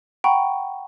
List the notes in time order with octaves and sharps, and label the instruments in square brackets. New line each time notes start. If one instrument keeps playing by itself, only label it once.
[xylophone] F#5 G5 A#5 B5 C#6